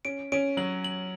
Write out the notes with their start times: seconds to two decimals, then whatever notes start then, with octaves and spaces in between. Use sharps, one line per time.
0.05 C#4 D7
0.32 C#4 D7
0.57 F#3 F#7
0.84 F#7